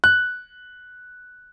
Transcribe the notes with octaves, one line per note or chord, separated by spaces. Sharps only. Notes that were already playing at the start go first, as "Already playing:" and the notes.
F#6